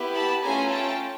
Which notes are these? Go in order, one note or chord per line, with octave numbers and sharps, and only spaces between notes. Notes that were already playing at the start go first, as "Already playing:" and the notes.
Already playing: B3 E4 G4
A5 B5
A3 C#4 F4 A4 G#5 A#5
G5 A5